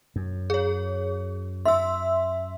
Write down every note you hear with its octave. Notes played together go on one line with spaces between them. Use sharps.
F#2
G#4 C#5
E5 C6 E6